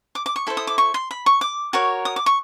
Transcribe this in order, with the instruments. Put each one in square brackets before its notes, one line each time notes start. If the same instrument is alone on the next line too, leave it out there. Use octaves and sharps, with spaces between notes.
[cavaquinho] D6
D6
C#6
E4 A4 C5
D#6
D6
C#6
C6
B5
C#6
D6
F#4 A#4 C#5
D#6
D6
C#6